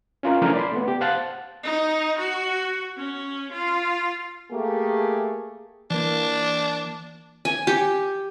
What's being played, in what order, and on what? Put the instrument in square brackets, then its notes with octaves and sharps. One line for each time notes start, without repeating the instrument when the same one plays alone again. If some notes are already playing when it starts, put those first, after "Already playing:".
[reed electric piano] C#4 F4 A#4
E3 F3 A3 C#4 D4 A#4
D5 B5 C6
A3 B3
G4
C5 F5 F#5 A5 F#6 A6
[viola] D#4
F#4
C#4
F4
[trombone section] A3 A#3 G4 G#4
[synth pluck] E3 A#3 [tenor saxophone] D4
[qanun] G#5
G4